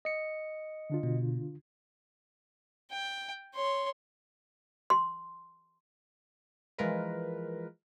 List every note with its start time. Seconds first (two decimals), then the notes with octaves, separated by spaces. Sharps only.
0.05 D#5 C#7
0.90 D3 D4 F4
1.03 B2
2.92 G5
3.54 C#5 C6
4.90 C6
6.78 E3 F3 G#3 F4 A#4 B4